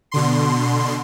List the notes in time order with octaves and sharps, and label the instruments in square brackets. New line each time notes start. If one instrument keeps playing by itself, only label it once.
[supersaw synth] B2 D3 C6